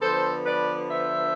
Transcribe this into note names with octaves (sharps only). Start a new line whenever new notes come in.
D3 F3 B3 A4 C5
B4 D5
C5 E5